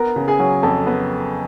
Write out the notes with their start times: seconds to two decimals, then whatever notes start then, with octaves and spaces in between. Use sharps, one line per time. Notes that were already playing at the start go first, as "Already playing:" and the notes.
Already playing: B3 A#4 A#5
0.16 C#3
0.28 G#4 G#5
0.39 F#3
0.63 F2 A4 A5
0.86 B3